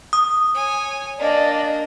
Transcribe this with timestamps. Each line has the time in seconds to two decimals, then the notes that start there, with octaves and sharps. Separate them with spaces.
0.13 D#6
0.54 C#5 G#5
1.19 A#3 D4 D5 D#5